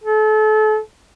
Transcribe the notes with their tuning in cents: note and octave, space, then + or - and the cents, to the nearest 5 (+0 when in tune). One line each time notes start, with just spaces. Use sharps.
A4 -35